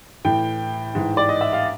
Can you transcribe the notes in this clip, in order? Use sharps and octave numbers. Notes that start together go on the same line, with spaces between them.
A2 E3 G5
G#2 E3
D5
D#5
E5
F5